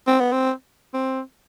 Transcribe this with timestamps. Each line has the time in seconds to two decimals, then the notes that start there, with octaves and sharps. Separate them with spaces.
0.07 C4
0.20 B3
0.32 C4
0.94 C4